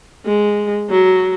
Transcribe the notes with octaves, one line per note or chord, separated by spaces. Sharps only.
G#3
F#3